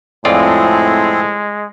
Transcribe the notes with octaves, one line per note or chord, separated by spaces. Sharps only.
F2 A2 G#3 C4 F4 G#4 A4 D5